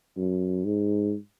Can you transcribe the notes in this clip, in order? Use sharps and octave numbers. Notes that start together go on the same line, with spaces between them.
F#2
G#2